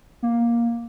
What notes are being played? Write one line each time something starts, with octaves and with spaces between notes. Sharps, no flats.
A#3